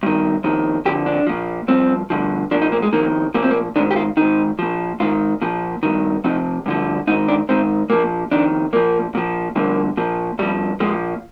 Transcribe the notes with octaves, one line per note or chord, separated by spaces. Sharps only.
G2 D#3
F2 D#3
F2 D3 F3 G4
D4
A#2 F3
G2 F3 C4
G2 D3 F3
A#2 F3 D4
D#4
A#3
G#3
F2 D#3 A#3
A#2 F3 A#3
C4
A#3
G#2 D#3 D4
G4
F4
G#2 D#3 D#4
A#2 F3
G#2 D#3 F4
A#2 F3
G2 D#3
F2 C3 F3 D#4
G2 D3 F3
G#2 D#3 D#4
D4
G#2 D#3 C4
A#2 F3 A#3
F2 D#3 D4
A#2 F3 A#3
A#2 F3
G2 D3 F3 A#3
A#2 F3
G2 F3 G3
A#2 F3 G#3